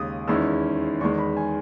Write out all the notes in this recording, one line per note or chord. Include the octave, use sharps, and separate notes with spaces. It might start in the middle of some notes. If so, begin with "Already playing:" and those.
Already playing: D#2 C#3 G#3 D#6
E2 D#3 G#3 C#4 E4 E6
E2 D#3 G#3 C#6
B5
G#5